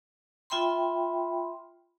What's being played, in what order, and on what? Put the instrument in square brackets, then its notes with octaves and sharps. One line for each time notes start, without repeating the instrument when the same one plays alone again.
[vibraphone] F4 E5 G5 B5 C6